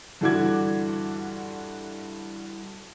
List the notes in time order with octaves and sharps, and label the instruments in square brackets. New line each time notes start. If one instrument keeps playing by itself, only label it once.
[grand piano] G2 D3 E3 F#4 D6 G#6